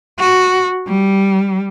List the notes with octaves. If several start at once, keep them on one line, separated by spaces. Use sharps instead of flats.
F#4
G3